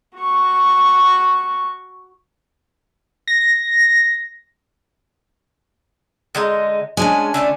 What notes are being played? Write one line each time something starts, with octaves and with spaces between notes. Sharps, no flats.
F#4 C#6
A#6
D3 G#3 D#4
G#3 C#4 D4 G#5
D3 A3 A5